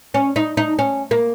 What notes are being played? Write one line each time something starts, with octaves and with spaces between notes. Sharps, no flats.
C#4
D#4
D#4
C#4
A#3